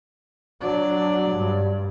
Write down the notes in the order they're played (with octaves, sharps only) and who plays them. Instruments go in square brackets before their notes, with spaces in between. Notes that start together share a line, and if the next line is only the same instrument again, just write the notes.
[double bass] F#3 D4 [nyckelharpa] D5
[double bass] G2